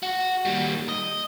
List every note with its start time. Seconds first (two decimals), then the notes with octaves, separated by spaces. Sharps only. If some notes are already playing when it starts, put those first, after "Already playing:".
0.03 F#4
0.45 D#2 G3
0.89 D#5